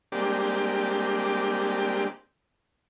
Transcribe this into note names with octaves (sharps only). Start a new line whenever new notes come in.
G3 G#3 A#3 C4 D4 G4